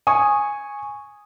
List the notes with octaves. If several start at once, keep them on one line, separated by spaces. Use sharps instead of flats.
G#5 C#6 D#6